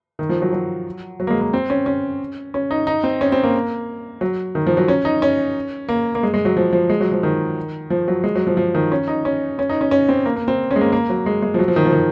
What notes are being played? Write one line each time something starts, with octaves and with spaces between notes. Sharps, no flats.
D#3
F3
F#3
F#3
F#3
A#3
G#3
A#3
C4
C#4
C#4
C#4
D#4
D#4
C4
C#4
C4
A#3
F#3
D#3
F3
F#3
C#4
D#4
C#4
A#3
A#3
G#3
G#3
F#3
F3
F3
G#3
F#3
F3
D#3
F3
F#3
G#3
F#3
F3
F3
D#3
C#4
D#4
C#4
C#4
D#4
C#4
C#4
C4
A#3
A#3
C4
C#4
G#3
A#3
A#3
F#3
G#3
G#3
F3
F#3
F3
D#3
F3
D#3